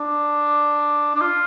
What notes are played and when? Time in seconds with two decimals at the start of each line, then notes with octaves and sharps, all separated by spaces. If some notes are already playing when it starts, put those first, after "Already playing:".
Already playing: D4
1.15 D4
1.21 F4